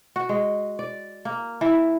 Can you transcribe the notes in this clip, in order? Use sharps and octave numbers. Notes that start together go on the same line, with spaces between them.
F#4
G#3
D5
A#3
E3